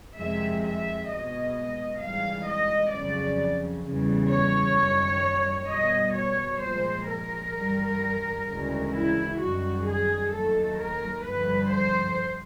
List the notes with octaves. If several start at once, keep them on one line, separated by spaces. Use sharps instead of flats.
F2 C3 D#3 G#3 E5
E5
B2 G#3 D#5
G#2 E3 G3 F5
D#5
F2 C#3 F#3 D5
E2 C#3 E3 G3
C#5
F#2 D#3 G3
B2 G3 D#5
C#5
A#2 F3 G#3 C5
A#4
G2 E3 G3
D2 C#3 E3 G#3
E4
F#2 D#3 G3 F#4
G#4
D#2 D#3 F#3 A3 A4
A#4
G2 D3 F3 A3 B4
C5